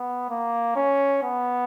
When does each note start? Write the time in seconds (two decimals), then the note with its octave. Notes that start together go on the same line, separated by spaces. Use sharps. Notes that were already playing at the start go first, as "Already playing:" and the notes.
Already playing: B3
0.30 A#3
0.76 C#4
1.23 B3